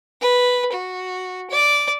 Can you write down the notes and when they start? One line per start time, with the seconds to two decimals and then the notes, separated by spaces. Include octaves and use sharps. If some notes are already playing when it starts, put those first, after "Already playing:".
0.22 B4
0.73 F#4
1.50 D5